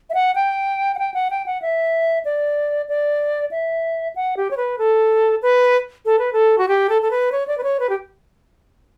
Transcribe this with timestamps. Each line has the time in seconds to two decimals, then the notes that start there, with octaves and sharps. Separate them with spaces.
0.10 E5
0.14 F#5
0.35 G5
0.95 F#5
0.99 G5
1.14 F#5
1.30 G5
1.46 F#5
1.62 E5
2.25 D5
2.89 D5
3.51 E5
4.16 F#5
4.37 G4
4.51 C#5
4.57 B4
4.78 A4
5.42 B4
6.05 A4
6.19 B4
6.33 A4
6.58 F#4
6.68 G4
6.89 A4
7.02 A4
7.11 B4
7.32 C#5
7.48 D5
7.58 B4
7.63 C#5
7.80 B4
7.89 G4